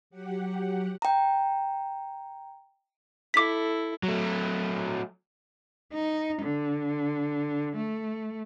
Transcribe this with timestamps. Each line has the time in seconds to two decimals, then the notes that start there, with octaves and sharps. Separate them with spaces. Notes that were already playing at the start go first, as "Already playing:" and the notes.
0.10 F#3 G4 F#5
1.02 G5 A#5
3.34 E4 A4 D6 B6
4.03 F#3 A3
5.94 D#4
6.42 D3
7.76 A3